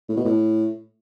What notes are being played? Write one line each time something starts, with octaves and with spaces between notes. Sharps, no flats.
A2
B2
A2